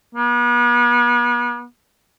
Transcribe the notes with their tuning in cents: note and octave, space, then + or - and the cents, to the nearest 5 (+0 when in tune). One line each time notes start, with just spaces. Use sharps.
B3 -40